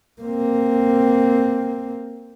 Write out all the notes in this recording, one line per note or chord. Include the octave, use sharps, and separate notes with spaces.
A#3 C4